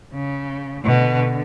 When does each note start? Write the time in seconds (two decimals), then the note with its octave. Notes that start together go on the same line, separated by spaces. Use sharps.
0.12 C#3
0.85 B2 D3